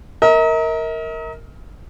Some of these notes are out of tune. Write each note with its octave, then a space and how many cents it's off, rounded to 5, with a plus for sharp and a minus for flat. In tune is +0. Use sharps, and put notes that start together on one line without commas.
A#4 -5 D#5 +45